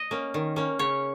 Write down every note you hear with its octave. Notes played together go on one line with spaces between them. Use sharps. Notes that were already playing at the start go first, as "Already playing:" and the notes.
Already playing: D#5
A#3 C#4
D#3
A#3 C#4
C#3 C#5